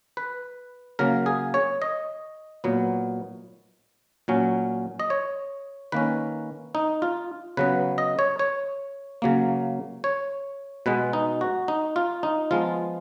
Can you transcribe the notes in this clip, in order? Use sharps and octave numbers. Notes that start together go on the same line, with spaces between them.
B4
C#3 F#3 A#3 A#4
G#4
C#5
D#5
A#2 F#3 B3
A#2 F#3 C#4
D#5
C#5
D#3 A#3 C#4 B4
D#4
F4
C#3 F#3 B3 B4
D#5
C#5
C#5
C#3 F#3 A#3
C#5
B2 G#3 B3 B4
D#4
F#4
D#4
F4
D#4
F3 G#3 B3 F4